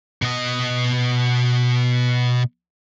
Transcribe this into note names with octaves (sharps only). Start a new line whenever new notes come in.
B2 D#5